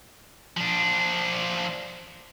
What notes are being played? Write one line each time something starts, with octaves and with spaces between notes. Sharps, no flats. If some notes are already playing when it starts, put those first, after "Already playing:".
F3 D4